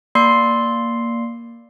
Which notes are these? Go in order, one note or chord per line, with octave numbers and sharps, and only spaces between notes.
A#3 D5 C6 C7